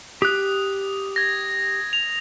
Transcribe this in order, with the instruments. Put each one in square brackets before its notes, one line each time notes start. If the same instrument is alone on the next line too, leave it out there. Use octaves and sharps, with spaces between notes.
[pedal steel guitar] G4 F#6 [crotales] D#6
[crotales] G#6 A#6
F7